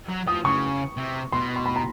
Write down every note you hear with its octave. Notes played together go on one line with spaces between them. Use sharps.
F#3
F3 D#6
C#3 C#6
C3
B2 C6
C6
B5
A#5